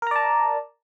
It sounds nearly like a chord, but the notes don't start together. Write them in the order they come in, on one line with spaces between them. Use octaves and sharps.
A#4 A#5 D5 A5